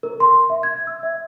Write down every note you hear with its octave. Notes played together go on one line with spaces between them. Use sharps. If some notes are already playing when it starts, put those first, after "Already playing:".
A#4
C6
E5
G#6
E6
E5